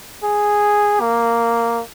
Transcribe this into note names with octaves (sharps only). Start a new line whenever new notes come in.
G#4
A#3